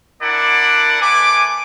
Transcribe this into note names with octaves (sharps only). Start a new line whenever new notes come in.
D4 E4 A#4 D5 F#5
A3 B4 G#5 D6